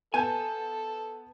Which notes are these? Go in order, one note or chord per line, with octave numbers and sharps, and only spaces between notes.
B3 A4 G#5 A5 G6